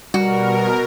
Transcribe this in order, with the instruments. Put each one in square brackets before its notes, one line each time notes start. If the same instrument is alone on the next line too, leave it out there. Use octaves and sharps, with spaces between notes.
[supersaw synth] B2 A#4 [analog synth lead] G3 [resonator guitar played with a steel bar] F#4